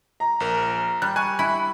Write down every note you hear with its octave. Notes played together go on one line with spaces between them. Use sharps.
A#5
A#1 A#4
G3 F#6
G#5 C#6 F#6
E4 B5